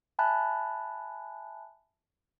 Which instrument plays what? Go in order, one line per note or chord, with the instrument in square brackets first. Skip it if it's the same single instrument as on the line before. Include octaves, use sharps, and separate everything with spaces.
[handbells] E5 G#5 A5 B5 F#6